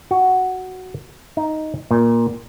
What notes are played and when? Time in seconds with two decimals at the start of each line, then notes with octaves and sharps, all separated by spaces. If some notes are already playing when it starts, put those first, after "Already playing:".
0.11 F#4
1.37 D#4
1.91 A#2